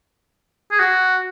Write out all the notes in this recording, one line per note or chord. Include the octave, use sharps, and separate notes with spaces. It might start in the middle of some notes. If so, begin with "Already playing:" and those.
G#4
F#4